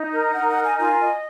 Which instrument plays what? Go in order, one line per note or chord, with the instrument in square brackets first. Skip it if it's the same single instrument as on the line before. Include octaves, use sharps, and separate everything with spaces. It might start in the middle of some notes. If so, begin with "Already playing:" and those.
Already playing: [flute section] D#4
A#4
[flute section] D#4 [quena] F#5
[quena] F#5
[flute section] A#4
[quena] G#5
[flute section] F4 [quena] G#5
[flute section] D#5